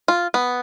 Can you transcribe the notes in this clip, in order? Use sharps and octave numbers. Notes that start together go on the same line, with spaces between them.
F4
B3